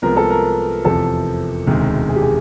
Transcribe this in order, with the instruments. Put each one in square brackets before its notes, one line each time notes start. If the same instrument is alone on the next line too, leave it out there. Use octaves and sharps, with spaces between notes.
[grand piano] C2 C3 F3 G#3 B3 [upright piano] A#4
[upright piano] A4
A#4
[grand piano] F1 E2 C3 F3 [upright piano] A4
[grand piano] E1 D2 C3 D#3 G#3
[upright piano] G#4
G4
G#4